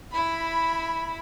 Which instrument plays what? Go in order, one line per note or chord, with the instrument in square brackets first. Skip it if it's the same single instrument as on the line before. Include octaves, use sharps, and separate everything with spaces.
[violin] E4 B5